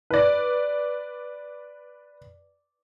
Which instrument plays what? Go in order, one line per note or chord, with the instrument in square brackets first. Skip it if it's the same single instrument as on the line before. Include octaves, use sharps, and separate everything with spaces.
[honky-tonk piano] B4 D5